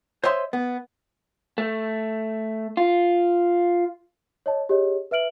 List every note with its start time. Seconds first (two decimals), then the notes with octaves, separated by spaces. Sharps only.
0.24 C5 C#5 D#5 E5 C6
0.53 B3
1.58 A3
2.77 F4
4.46 C#5 D#5 A5
4.69 G4 G#4 C#5 D#5
5.11 B4 E5 F6 D7 F#7